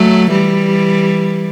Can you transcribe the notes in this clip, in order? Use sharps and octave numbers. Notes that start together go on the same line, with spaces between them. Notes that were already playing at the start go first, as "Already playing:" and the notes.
Already playing: F#3 A3
E3 G3